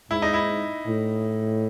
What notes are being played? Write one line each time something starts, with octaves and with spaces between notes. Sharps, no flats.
G#2 E4
D#4
E4
A2